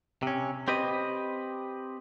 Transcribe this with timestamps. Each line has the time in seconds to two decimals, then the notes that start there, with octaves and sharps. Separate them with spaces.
0.23 C3 C#4
0.68 C4 G4 B4 D#5